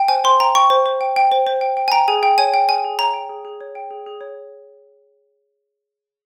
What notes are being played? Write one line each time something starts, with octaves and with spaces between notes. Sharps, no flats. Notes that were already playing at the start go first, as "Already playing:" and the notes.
Already playing: G5
C5 G#5
C5 C6
G5 A#5
G5 C#6
C5
C5
G5
G5
C5
C5
G5
G5
G#5
G5 A#5
G#4 G#5
G#4 G5
C#5 G#5
G5
G#4 G#5
G#4
C#5 A#5
G5
G#4
G#4
C#5
G5
G#4
G#4
C#5